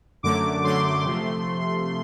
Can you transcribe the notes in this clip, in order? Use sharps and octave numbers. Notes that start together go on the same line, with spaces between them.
F#2 D3 F#3 A3 D6
F#2 D3 F#3 A3 C6
C3 F3 A3